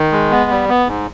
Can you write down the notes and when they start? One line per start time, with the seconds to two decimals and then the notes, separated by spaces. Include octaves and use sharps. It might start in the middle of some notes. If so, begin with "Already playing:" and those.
Already playing: D#3
0.12 G#3
0.31 B3
0.51 G3
0.69 B3
0.88 G#2